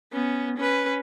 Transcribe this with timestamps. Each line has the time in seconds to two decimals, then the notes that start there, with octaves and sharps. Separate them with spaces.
0.13 B3 C#4
0.57 C#4 B4